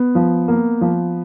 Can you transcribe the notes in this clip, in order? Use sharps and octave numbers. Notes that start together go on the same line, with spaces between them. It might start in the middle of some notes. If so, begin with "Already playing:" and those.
Already playing: B3
F3
A#3
F3